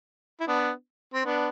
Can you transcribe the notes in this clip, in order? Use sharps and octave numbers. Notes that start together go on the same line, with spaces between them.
E4
B3 D4
C4
B3 D4